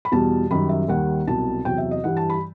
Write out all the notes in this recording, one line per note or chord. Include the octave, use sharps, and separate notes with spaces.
B5
E2 B2 G3 A5
F#2 D#3 G3 B5
E5
D#2 D#3 G3 F#5
C2 B2 F#3 A5
E2 C3 F#3 G5
E5
D#5
G2 E3 G3 F#5
A5
B5